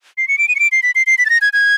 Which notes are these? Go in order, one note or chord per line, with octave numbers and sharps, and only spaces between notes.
C7
C#7
D7
D#7
C#7
D7
C7
B6
C7
C7
B6
A6
A#6
G#6
G#6